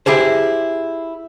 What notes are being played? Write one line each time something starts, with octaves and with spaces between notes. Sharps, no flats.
E4 G4 G#4 C5